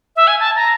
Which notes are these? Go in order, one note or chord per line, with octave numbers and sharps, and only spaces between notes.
E5
G#5
A5
A#5